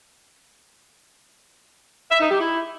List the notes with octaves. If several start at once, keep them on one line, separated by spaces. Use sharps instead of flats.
E5
D#4
G4
E4